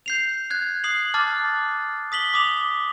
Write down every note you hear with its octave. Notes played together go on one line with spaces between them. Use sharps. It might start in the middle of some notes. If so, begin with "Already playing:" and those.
G6 C7 F7
F#6 G#6
D#6 C7 F#7
A5 D6 F6 F#6 A6
D#6 B6 F#7 G7
D6 D#6 F7